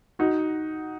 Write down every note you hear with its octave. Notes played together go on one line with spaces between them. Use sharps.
D#4 F#4